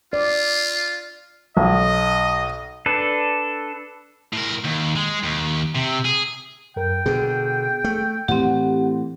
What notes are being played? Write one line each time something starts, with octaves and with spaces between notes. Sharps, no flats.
F4 D5
B1 D#5
D4 A4 B4
A2 A#4
D#2
G#3
D#2
C3
G#4
F#2 A#4 G5
B2 D3 G#4
A3
A2 E3 C4 G4 F#5